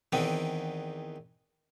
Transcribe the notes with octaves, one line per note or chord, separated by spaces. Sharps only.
E2 D#3 B3 C4